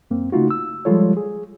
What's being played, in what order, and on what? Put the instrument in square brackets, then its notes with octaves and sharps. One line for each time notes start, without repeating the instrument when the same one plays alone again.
[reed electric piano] F#2 A#3 C4
C#3 A3 D#4 F4 F#4
E6
F3 G3 G#3 F4 A4 C#5
G#4